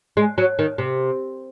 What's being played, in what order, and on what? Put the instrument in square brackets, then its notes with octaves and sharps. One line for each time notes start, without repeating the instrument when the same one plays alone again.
[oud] G#3
F#3
D#3
C3